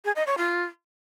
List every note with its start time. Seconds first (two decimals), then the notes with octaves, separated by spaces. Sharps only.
0.05 G#4
0.16 D#5
0.27 C#5
0.38 F4